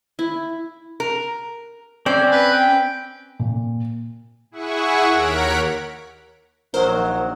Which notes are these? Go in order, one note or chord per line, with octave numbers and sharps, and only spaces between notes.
E4
A#4
C4 C#4 C5 D5
B4
G5
A#2
E4 G#4 E5 F#5 G#5 C#6
D#2 A#4 C#5 F#5 B6 D7
A#1 D#3 F#3 A#4 C5